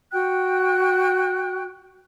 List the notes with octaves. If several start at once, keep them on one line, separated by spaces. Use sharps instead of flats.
F#4 G5 F#6